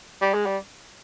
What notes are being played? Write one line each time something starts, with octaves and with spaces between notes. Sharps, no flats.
G3
G#3
G3